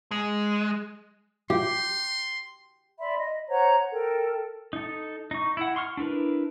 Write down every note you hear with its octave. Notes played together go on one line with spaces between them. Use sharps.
G#3
G4 C6
D5 E5 B5 C6
D#5
C5 C#5 F#5 A#5
A4 A#4 G5
D#4 A4
D#4 C#6
E4 F#5
C6 C#6 F6
D4 E4 A#4 B4